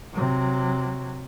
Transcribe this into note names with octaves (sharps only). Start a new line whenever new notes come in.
C3 F#3